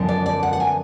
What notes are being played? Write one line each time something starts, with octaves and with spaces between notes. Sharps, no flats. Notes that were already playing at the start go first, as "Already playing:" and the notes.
Already playing: F#2 D3 F3 B3 D4
D5
D5
F#5
F#5
G#5